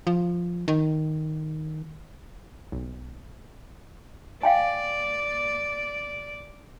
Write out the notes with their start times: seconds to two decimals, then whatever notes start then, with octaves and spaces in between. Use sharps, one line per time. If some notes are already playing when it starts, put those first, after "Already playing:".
0.07 F3
0.68 D#3
2.72 B1
4.43 D5 F5 G5 G#5